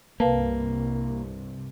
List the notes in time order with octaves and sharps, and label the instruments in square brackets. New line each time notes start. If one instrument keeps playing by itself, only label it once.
[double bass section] C2 G2 C3 [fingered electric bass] A#3 [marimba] B4 F5 A5